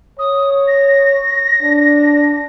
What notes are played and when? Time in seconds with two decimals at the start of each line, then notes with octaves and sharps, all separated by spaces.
0.19 C#5 D#6
0.68 A#6
1.62 D4